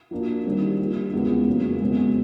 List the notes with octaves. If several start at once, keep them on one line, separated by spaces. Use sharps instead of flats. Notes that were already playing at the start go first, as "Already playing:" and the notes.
F3 A#3 D4 F#4
D#3 G3 C4
F3 A#3 D4 G4
E2 C#3 F3 G#3 B3
F2 C#3 F#3 A#3
B2 G#3 C4